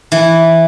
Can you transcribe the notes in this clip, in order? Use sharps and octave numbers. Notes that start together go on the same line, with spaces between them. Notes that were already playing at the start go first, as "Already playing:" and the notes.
E3